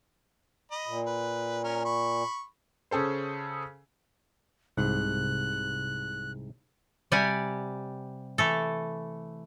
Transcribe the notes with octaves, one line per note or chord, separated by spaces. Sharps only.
D#5 B5
A#2
B4
C#4 A#4
B5 C#6
C#3 C#4 G#4 A4 C5
C2 G#2 F#6
C3 G3 G4 D5 F#5 G#5
E3 A3 A4